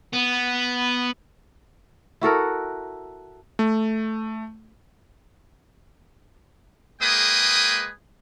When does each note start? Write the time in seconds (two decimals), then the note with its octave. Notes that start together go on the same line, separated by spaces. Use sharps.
0.13 B3
2.21 E4 F#4 A4 A#4
3.59 A3
7.01 G#3 A#3 G#4 B4 G5 D#6